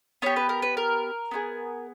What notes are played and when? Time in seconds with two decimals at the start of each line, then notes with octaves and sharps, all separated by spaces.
0.22 B3 G4 C#5
0.36 B4
0.49 A#4
0.62 B4
0.77 A#4
1.31 B3 E4 G#4